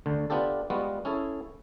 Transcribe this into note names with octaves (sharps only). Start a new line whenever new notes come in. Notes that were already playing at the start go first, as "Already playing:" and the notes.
D2 D3
B3 D4 F4 G4 A4
G3 G#3 B3 F4 F#4
C#4 E4 G#4 A4